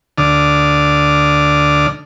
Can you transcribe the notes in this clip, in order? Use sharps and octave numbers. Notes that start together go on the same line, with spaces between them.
D2 D3 D5 D#6 F6